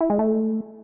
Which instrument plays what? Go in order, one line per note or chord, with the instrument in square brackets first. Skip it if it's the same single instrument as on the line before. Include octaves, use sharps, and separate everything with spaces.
[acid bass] E4
G#3
A3